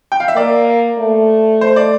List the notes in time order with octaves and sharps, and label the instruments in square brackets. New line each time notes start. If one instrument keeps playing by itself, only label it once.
[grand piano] G5
F5
E5
[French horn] A#3 [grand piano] D5
[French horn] A3
[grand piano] C5
D5